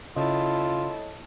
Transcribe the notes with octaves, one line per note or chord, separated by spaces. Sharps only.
C#3 E4 F4 A4 C#5 D#5 A5